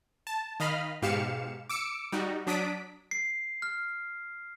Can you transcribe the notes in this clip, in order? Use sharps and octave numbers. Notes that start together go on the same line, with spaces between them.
A5
D#3 D#5 F5 B5 F6
G#2 B2 G4 F5 C#7 E7
D6 E6 C#7 D7
G3 D#4 F#4
F#3 D4 D#6 B6 D7
C7
F6